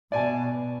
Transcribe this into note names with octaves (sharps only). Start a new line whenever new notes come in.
B2 D5 G#5 A5